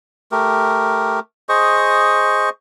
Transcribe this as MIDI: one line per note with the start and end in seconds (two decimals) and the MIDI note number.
0.32 1.19 57
0.32 1.19 67
0.32 1.19 70
1.49 2.49 68
1.49 2.49 72
1.49 2.49 75
1.49 2.49 85